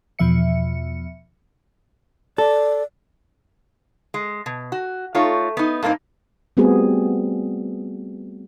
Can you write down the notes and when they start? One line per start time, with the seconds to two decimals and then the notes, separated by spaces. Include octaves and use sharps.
0.19 E2 B2 F3 E5 C#7
2.38 A4 D5
4.14 G#3
4.46 B2
4.72 F#4
5.15 A3 D#4 F4 C#5
5.57 B3 D#4
5.83 G2 A3 A#3 C4 D#4
6.57 G3 A3 B3 C4 F#4 G#4